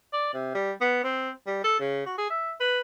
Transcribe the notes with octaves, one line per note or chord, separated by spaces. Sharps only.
D5
C3
G3
B3
C4
G3
A4
C#3
F#4
G#4
E5
B4